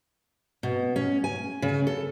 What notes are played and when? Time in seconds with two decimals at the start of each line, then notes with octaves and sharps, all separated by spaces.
0.63 B2
0.96 C#4
1.24 G#5
1.62 C#3
1.87 A4